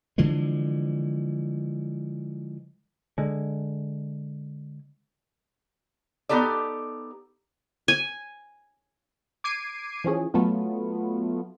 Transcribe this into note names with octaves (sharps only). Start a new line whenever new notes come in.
D3 E3 F3 G#3
D3 G#3
B3 D#4 G4 A4 D5
G#5
D6 G#6 C7 D7 D#7
E3 F3 C#4 G#4
F#3 A3 B3 F4